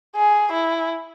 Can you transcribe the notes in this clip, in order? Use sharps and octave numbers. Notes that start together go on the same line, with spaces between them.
G#4
E4